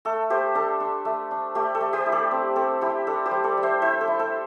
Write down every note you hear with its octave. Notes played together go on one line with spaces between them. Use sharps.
A3 A4
A3 G4 C5
D4 A4
D4
A3
D4
A3 G4
A4
A3
G4 C5
E4
A4 D5
C4
C4 A4
E4 G4
D4 A4
G4 C5
G3
A4 D5
G3
C5 E5
E4 C5 E5
A4
E4
A4